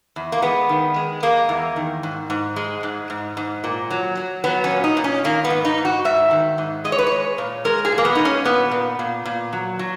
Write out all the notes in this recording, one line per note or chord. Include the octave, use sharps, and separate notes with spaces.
E2
A#3
G#3 B3
D#3
G#3
G#3 A#3
E2
D#3
G#2
G#2
G#3
G#2
G#2
G#2
A#2
F#3
F#3
F#3 B3
C#4
A#2
D#4
A#2
C#4
D#3 A#3
B3
G#2
D#4
G#2
F#4
G#2 E5
D#3
G#2
G#3 D#5
C#5
B4
C#5
G#3
A#2
G#3 A#4
G#4
A#2
A#3
B3
G#3 D#4
C#4
A#2 B3
A#2
A#2
A#2
F#3
F#3